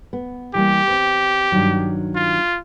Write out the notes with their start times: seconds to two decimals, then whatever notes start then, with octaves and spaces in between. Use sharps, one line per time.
0.13 B3
0.55 E3 G3 A#3 G4
0.88 C4 B4
1.52 G2 D#3 F#3
2.15 F4